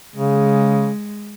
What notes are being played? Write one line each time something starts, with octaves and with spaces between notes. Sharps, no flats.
C#3 G#3